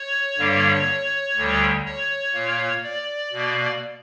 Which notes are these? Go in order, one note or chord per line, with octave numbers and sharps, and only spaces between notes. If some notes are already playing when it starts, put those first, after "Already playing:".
Already playing: C#5
G2 D3 G3 A#3
D2 D3 G3
C#5
A#2 A#3
D5
B2 A#3